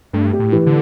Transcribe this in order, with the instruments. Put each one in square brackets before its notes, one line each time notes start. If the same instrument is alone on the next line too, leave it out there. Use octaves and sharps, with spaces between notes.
[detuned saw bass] G2 [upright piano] A3
[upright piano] G4
[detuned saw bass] A2
[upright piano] E3
[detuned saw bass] D3